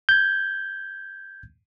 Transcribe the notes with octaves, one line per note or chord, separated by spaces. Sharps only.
G6 G#6